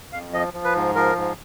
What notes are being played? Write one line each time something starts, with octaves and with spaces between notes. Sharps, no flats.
F2 F5
F3 D#5
F3
B4
G#2
F3 A#4
G#2